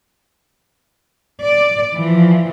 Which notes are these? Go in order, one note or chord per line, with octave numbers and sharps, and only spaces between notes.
D5
E3 F3